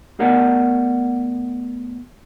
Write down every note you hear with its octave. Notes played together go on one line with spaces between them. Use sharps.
A3 B3 G#4 A#4 D5 F#5